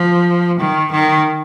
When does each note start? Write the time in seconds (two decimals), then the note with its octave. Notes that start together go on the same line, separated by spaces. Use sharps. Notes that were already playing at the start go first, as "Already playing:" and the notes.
Already playing: F3
0.60 D#3
0.92 D#3